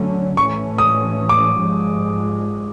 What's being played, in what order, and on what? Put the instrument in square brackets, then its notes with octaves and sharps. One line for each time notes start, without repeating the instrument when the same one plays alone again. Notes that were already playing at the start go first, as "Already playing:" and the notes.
Already playing: [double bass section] D3 F#3 A3 C#4
[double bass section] A2 E3 A3 C#4 [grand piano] C#6
[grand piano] D#6
D6
[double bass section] G#2 F3 G#3